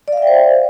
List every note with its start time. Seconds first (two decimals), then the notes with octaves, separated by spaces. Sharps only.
0.08 D5
0.13 F5
0.17 E5
0.22 G5
0.27 C5